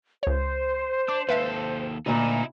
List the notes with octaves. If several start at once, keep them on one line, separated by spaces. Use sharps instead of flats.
C#2 C5 C#5
D4 D6
D#2 A4 B4 E5 F5
D2 A#2 D#4 E4